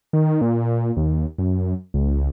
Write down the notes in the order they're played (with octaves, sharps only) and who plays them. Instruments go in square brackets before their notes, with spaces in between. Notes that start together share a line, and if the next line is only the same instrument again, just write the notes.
[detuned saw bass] D#3
A#2
D#2
F#2
C#2